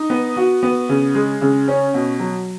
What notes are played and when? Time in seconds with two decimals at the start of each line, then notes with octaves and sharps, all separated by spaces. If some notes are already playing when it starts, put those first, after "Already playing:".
Already playing: D#4
0.10 B3
0.36 F#4
0.63 B3
0.89 C#3
1.15 G#3
1.41 C#3
1.68 C#4
1.94 B2
2.19 F#3